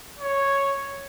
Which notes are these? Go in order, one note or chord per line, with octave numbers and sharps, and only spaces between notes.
C#5